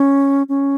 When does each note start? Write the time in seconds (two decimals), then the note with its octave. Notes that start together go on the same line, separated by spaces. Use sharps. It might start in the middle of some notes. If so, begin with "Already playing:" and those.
Already playing: C#4
0.49 C#4